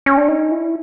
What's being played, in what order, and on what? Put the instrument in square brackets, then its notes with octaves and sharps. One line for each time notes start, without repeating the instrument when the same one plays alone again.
[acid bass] C#4
D4
D#4
E4